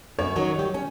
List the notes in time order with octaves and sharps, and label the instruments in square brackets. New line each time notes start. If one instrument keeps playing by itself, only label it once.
[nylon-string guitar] F#2 [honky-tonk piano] C#5
[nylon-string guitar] D#3 F#3
G3 G4
C#4